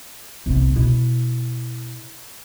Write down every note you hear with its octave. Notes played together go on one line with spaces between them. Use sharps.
C2 B3
B2 E4